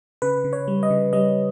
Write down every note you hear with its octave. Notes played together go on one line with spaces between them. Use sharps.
C#3 B4
C#3
C#5
G3
D#5
C#3
G3 D#5